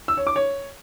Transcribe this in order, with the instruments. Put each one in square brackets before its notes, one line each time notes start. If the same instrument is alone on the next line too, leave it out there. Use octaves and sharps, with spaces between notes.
[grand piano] E6
C#5
D6
C#5